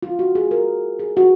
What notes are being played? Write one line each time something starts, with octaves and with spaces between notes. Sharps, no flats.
F4
F#4
G#4
A#4
G#4
F#4